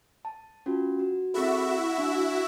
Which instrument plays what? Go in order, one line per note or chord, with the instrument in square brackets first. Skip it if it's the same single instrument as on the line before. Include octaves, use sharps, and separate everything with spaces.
[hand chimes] A5
C#4 F4 F#4
F#4
[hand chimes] C4 G#4 A4 [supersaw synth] E4 F#4 E5
[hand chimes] D4